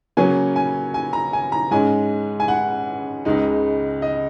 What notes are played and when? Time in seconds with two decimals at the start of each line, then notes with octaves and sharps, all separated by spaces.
0.17 C#3 F#3 A#3 C#4 G#5
0.56 G#5
0.94 G#5
1.13 A#5
1.33 G#5
1.52 A#5
1.71 G#2 G#3 C#4 G#5
2.40 G#5
2.48 F#5
3.25 C#2 C#3 G#3 D#4
4.02 D#5